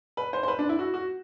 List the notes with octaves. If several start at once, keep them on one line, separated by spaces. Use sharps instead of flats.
B4
C5
C5
B4
D4
E4
F#4
F#4